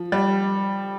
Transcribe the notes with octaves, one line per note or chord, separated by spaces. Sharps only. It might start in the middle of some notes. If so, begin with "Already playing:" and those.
Already playing: F3
G3